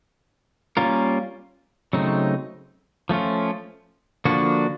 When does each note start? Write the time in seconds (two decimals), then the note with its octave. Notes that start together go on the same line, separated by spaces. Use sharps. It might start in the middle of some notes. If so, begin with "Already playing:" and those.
0.77 G3 A#3 C#4 F4 A#4
1.93 C#3 F#3 A3 C4 D#4
3.09 F3 A3 C#4 F4
4.25 D3 F3 A#3 D4 F#4